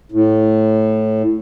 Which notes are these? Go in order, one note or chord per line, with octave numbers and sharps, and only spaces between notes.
A2